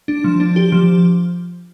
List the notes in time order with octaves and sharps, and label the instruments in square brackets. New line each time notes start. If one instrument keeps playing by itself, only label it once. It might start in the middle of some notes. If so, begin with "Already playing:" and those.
[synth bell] D4
F3
D4
G4
F3